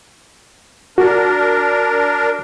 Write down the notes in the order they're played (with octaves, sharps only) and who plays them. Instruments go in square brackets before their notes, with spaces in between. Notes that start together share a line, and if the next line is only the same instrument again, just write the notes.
[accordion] D4 A#4 [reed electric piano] F#4